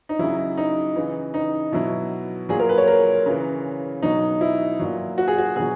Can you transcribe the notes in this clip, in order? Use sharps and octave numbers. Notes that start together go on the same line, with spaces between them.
D#4
C#3 F#3 E4
D#4
C#3 E3
D#4
B2 F#3 E4
A#2 F#3 G#4
A#4
B4
C#5
A#4
C#3 E3
B2 F#3 D#4
E4
A#2 F#3
F#4
G#4
F#4
B2 F#3 G#4